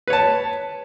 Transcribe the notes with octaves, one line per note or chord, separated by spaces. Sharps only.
B4 C#5 A5